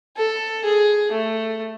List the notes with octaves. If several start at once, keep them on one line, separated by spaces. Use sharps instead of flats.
A4
G#4
A3